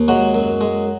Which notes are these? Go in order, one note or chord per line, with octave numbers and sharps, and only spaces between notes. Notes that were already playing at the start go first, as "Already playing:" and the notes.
Already playing: D#2
F#3 G#3 F#4
F#2
G#3